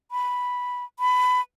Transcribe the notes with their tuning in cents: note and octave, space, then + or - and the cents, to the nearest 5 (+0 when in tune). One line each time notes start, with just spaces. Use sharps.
B5 -5
B5 +20